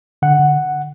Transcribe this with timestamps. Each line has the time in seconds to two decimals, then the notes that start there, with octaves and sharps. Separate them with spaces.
0.22 D3 F#5
0.39 D3